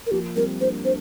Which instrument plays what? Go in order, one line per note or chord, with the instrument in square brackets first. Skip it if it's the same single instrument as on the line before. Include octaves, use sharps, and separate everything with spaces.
[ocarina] A#4
[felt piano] F3 A#3 [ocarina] G4
[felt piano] G3 C4 [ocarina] A#4
[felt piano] A#3 D4 [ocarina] C5
[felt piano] A#3 D4 [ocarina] C5